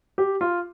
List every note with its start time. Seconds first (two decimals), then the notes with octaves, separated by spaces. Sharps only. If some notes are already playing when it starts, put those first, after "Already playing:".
0.18 G4
0.41 F4